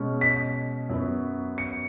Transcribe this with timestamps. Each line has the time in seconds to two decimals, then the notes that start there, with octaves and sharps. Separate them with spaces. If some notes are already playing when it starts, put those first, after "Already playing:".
Already playing: B2 G#3 C#4
0.21 B6
0.90 F#2 F#3 B3
1.58 C#7